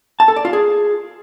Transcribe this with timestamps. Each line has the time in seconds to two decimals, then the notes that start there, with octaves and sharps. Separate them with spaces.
0.20 A5
0.28 A4
0.36 D5
0.45 F4
0.53 G#4